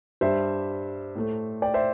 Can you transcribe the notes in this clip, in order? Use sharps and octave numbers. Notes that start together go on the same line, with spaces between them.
G2 G3 C5 E5
A2 A3
D5 G5
C5 E5